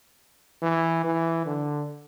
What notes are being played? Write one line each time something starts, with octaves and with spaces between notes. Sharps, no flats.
E3
E3
D3